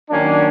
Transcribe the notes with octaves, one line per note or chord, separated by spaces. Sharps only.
D#3 F#3 A#3 C#4 D4